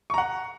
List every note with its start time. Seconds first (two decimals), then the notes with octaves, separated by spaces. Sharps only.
0.10 C#6
0.14 A#5
0.18 F#5